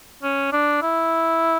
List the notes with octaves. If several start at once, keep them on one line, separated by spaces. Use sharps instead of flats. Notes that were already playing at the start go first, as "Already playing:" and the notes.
C#4
D4
E4